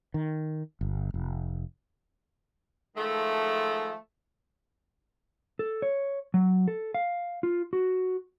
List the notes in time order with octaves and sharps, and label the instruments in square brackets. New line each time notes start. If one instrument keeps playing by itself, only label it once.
[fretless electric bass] D#3
G1
F1
[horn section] D#3 F3 G#3 A3
[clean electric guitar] A4
C#5
F#3
A4
F5
F4
F#4